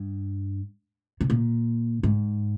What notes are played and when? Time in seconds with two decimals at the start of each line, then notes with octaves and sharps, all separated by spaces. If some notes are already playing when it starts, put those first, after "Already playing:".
Already playing: G2
1.21 C3
1.30 A#2
2.03 G#2